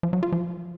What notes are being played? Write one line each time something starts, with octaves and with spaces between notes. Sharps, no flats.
F3
F#3
F4
F3